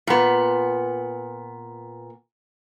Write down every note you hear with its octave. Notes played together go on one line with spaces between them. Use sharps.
A#2 B3